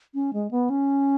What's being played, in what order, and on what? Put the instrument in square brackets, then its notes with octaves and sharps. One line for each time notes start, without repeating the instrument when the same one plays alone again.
[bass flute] C#4
G#3
B3
C#4